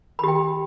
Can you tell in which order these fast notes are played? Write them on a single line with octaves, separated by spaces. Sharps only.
B5 G4 G5